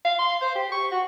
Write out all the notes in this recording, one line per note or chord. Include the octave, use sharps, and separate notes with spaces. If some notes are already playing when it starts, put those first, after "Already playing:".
F5
C6
C5
G4
C#6
F#4